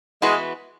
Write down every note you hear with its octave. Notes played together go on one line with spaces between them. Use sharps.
E3 G#3 B3 F#4 B4